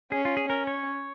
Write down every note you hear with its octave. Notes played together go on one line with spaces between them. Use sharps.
C#4 G#4
F4
G#4
C#4 A#4
C#5